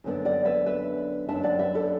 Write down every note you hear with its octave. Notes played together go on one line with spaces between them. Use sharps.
F#2 D3 B3 D4
D5 F#5
B4 E5
B4 E5
F#2 F#3 D4 E5 A5
D5 F#5
B4 E5
A4 D5